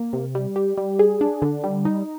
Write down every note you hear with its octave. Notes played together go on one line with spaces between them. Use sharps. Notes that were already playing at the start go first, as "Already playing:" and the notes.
Already playing: A#3
C3
G3
G4
G3
G#4
D4
D3
G3
D#4